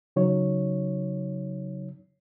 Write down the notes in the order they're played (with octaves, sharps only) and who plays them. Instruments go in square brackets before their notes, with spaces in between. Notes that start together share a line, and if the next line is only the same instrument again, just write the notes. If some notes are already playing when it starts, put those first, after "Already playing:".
[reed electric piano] C#3 F#3 D#4 C#5